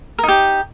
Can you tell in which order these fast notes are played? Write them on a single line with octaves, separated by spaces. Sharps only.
A#4 D#4 G4